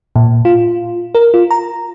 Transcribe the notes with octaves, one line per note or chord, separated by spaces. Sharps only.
A#2
F4
A#4
F4
A#5